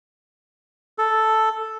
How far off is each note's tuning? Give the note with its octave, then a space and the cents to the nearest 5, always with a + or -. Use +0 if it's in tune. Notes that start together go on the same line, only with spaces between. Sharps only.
A4 +0